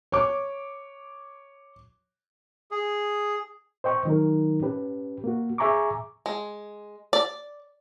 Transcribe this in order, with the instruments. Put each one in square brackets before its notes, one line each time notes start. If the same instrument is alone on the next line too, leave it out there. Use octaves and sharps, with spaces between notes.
[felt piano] C#5 D6
[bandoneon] G#4
[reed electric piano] C5 D#5 G5 C#6
D#3 F#3 D#4 A#4
C#4 G4 B4
A#3 F#4
G#4 E5 G#5 A#5 C#6 D6
[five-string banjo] G#3
D5